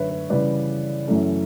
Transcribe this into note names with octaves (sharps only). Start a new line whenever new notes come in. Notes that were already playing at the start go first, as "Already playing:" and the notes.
Already playing: F#2 D3 A3 D4 B4 C#5 E5
B4
C#3 E3 G3 B4 D5
F#2 E3 A3 C#4